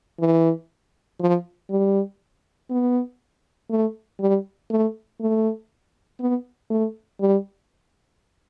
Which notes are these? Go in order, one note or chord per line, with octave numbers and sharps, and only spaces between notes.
E3
F3
G3
B3
A3
G3
A3
A3
B3
A3
G3